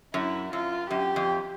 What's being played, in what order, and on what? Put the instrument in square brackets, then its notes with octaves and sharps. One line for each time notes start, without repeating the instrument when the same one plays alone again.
[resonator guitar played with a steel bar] F#2 [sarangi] E4
[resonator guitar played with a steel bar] F#2 [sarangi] F4
[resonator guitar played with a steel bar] F#2 [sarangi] G4
[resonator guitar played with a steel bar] F2